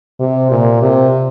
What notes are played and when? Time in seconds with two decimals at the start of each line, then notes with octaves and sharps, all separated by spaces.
0.20 C3
0.51 A#2
0.82 C3